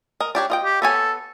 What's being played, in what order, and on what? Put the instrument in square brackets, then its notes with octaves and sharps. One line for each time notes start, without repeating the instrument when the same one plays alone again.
[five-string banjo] A#4 D#5
D4 G4 C#5
F4 D#5 G5
[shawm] G4
[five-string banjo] B3 C#5 G#5 [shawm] A4